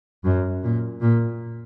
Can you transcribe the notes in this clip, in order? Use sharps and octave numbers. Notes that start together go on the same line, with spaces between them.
F#2
A#2
A#2